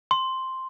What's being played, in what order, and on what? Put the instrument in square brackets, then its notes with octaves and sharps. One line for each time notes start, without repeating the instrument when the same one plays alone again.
[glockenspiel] C6